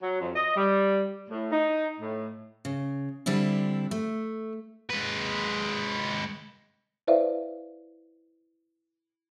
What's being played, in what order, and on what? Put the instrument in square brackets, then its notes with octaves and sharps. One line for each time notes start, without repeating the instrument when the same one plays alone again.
[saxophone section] F#3
F2
D#5
G3
A2
D#4
A2
[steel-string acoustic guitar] C#3
D3 G3 C4 D4 E4
A3
[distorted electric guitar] G#3 B4
[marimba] E4 B4 C5 D5 E5 F5